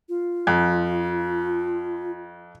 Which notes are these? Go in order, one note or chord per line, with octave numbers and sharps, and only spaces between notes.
F4
F2